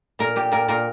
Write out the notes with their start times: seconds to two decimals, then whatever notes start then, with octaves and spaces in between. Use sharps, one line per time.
0.19 A#2 A#4
0.36 A#2 G4
0.52 A#2 A#4
0.68 A#2 A#4